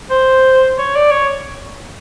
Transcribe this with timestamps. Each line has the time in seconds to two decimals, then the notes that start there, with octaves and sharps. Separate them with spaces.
0.10 C5
0.78 C#5
0.96 D5
1.12 C#5